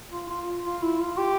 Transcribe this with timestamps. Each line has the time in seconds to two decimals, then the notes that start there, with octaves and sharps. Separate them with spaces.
0.11 F4
0.29 F4
0.64 F4
0.82 E4
1.00 F4
1.18 G4